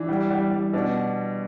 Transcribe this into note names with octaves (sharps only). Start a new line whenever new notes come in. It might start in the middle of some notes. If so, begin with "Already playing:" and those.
Already playing: E3 D4
G3
G3
G3
B2 D4